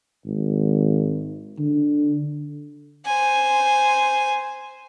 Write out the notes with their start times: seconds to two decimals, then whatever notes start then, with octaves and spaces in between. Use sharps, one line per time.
0.25 G#1
1.59 D3
3.06 C5 G#5